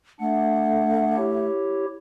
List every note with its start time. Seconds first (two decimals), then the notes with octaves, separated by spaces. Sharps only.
0.20 A3 D4 F#5
1.17 E4 G4 C#5